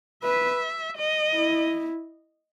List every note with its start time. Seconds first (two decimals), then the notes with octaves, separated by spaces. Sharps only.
0.23 B4 E5
0.97 D#5
1.34 E4